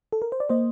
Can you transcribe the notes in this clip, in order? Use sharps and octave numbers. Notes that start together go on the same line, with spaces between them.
A4
A#4
C5
D5
A#3 C5 D#5